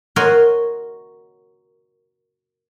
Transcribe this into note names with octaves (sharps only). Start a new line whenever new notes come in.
F#4 A#4 C#5 D#5 F#5 C6